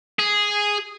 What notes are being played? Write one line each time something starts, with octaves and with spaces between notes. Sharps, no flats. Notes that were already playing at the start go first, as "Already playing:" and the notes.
G#4